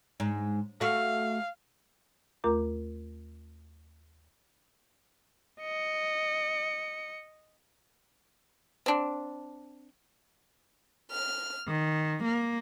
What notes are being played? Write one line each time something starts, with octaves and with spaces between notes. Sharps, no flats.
G#2
A3 F#4 F5
D#2 A3 F4 A#4 A#5 D6
D#5 C#7
C4 D4
F6
D#3
A#3